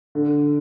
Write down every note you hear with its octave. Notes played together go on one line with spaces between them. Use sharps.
D3